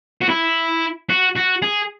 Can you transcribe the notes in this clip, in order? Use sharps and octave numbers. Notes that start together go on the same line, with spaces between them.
F#4
E4
F#4
F#4
G#4